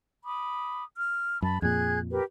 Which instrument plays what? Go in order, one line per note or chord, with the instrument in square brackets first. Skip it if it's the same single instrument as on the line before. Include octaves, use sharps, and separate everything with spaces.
[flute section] B5 D6 D#6
F6
[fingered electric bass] F#2 [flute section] A5 B5
[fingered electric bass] F2 A#2 [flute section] G#4 F#6 G#6
[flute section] G4 A#4 B4